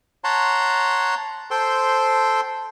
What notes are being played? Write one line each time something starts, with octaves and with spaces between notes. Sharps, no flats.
C#5 F#5 A5 A#5 C6
A4 C5 G5 C6